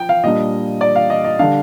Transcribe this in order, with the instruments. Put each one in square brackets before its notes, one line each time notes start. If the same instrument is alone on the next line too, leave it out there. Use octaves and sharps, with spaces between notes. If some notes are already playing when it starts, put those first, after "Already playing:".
Already playing: [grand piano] F3 G5
F5
A#2 G3 D4 D#5
D5
F5
D#5
D#5
D3 G3 D4 F5